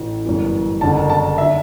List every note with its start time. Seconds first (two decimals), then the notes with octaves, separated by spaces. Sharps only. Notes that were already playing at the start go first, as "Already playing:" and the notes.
Already playing: A1 A2 E3
0.25 G1 F#2 E3
0.81 F#1 F#2 D3 A5
1.10 A5
1.38 D3 E5